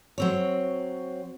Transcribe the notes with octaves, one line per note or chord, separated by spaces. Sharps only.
F#3 C4 C#5